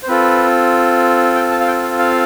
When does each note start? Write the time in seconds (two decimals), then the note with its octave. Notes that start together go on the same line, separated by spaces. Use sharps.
0.03 C5
0.08 C4 F4 A4 B4
1.35 G5
1.51 A5
1.60 F5
1.67 G5
1.83 F5
1.99 F5